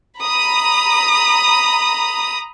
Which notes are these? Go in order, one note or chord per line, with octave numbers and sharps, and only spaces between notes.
A#5 B5 D#6